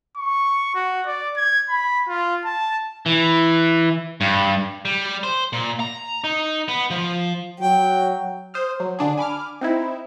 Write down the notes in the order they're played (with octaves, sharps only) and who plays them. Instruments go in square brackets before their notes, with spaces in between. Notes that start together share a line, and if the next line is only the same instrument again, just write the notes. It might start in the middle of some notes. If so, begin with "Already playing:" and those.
[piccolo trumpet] C#6
F#4
D5
G#6
B5
F4
A5
[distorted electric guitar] E3
G2
G3
C5
A#2
A#5
D#4
B3
F3
[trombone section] F#3 [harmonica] G5
[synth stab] C5 D#6 F6
F#3
D3 D4 G#4
G#5 B5 D6 F6
C4 D#4 E4